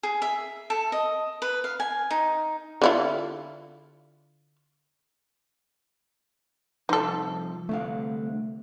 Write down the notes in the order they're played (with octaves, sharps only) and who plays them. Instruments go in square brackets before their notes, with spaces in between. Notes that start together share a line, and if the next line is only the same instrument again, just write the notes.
[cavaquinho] G#4
E5
A4
D#5
B4
F5
G#5
D#4
[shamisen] D3 E4 F4
[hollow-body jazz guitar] C2 F3 C6 [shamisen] D#4 A4
[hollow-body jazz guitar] C2 D3 F5 [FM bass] A3